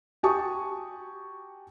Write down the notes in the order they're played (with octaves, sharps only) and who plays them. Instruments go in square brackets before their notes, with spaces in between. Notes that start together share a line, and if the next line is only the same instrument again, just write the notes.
[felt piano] F#4 G4 G#5 A5 C#6 D#6